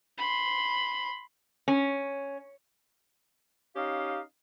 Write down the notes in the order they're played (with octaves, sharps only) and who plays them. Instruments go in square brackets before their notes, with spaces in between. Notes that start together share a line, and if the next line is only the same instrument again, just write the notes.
[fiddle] B5 C6
[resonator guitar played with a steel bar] C#4
[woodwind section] C#4 D#4 G4 D#5 F5